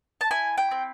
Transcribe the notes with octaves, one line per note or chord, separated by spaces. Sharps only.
A5
E4 G#5
G5
C4